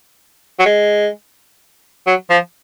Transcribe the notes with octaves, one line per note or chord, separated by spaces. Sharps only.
F#3
G#3
F#3
F3